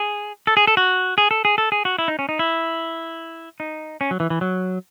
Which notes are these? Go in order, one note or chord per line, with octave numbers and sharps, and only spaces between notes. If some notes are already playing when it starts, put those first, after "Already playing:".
Already playing: G#4
A4
G#4
A4
F#4
G#4
A4
G#4
A4
G#4
F#4
E4
D#4
C#4
D#4
E4
D#4
C#4
F#3
E3
E3
F#3